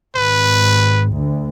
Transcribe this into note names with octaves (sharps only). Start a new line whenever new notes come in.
G#1 B4
D2